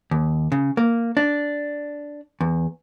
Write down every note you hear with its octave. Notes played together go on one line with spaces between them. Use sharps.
D#2
C#3
A#3
D4
E2